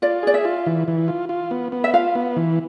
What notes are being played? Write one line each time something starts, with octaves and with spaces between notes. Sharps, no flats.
F4 D5
G#4 D5
E5
F4
E3
E3
F4
F4
B3
B3
E5
F4 F5
B3
E3